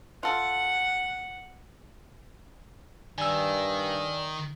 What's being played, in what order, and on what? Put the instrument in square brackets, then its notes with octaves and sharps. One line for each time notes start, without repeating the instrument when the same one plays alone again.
[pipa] F4 A4 [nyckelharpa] F#5
[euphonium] G2 [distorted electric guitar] D#3 [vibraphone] D5 [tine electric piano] G#5 E6